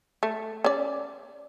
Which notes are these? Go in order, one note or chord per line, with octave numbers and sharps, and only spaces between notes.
A3
C#4 D5